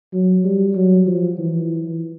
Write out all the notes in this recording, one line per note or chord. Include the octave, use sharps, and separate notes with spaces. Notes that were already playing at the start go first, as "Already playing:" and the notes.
F#3
G3
F#3
F3
E3